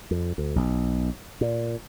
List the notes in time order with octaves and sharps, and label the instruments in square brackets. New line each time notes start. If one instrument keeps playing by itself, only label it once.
[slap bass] F2
D2
B1
A#2